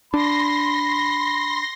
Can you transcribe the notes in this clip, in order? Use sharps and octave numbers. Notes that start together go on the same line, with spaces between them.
D4 B5 C6 A#6